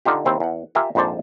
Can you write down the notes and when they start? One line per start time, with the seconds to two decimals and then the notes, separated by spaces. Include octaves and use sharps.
0.05 D3 D#4 F4 G4
0.25 D#2 C4 E4
0.40 E2 F#5
0.75 F4 G4 A#4 E5 G#5
0.95 A#1 F2 G#2 C5 D5 A5